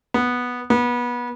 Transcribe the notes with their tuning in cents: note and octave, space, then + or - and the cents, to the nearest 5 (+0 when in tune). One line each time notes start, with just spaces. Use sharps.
B3 -5
B3 -25